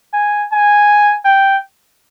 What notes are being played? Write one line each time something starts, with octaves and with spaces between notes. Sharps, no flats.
G#5
G#5
G5